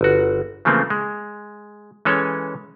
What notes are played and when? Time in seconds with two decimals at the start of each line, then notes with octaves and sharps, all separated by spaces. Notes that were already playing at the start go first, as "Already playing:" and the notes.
0.01 G1 F#4
0.65 C#3 E3 F3 A3 A#3 C4
0.90 G#3
2.05 E3 G#3 C#4 A4 C#5